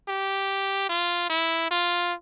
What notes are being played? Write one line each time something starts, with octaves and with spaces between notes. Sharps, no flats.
G4
F4
E4
F4